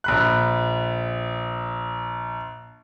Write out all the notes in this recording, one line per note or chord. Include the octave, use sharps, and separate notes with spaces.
A#1 B5 F#6